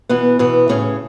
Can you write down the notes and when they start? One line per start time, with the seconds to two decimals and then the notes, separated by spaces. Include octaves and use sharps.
0.09 B2 E3 B3
0.39 B2 E3 B3
0.69 A2 C#3 C#4